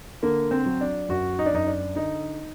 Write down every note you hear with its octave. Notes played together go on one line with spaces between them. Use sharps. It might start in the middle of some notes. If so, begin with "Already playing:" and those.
D3 A#3
C4
F#3
D4
F#2 F#4
D#4
D4
F#2 D#4
D4
D3 D#4